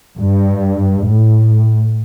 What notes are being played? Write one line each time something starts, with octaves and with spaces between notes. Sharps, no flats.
G2
A2